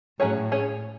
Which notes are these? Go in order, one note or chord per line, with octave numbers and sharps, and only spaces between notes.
A2 F#3 C#4 G#4 C#5
C#4 G#4 C#5